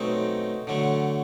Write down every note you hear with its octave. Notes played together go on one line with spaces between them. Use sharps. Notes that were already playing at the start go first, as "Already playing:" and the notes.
Already playing: B2 F#3 A3 C4 D#4
D3 F#3 A3